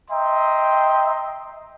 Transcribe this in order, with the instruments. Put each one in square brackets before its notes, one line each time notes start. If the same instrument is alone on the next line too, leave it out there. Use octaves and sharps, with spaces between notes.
[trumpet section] D#5 E5 G5 A#5 C6